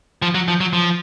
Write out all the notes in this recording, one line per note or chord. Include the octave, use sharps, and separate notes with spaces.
F3
F#3
F3
F#3
F3